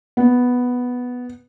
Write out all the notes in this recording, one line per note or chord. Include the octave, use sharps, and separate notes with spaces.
B3